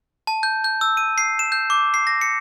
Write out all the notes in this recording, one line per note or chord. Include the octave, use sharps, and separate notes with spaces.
A5
G6
G6
E6
D#7
C7
E7
G6
D6
C7
A#6
C#7